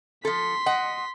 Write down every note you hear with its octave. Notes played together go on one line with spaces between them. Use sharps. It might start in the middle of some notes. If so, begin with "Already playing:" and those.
F3 A4 C6 B6
D#5 F#5